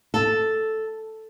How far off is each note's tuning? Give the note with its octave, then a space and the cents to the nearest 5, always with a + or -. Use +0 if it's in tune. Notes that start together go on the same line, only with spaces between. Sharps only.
A4 +0 A5 +0